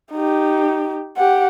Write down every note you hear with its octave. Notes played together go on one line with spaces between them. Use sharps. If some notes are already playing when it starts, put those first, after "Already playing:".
D#4 G4
G4 F#5